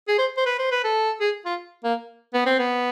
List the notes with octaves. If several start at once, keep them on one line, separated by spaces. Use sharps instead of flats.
G#4
C5
C5
B4
C5
B4
A4
G#4
F4
A#3
B3
C4
B3